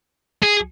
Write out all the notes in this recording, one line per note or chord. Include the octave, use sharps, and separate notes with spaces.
G#4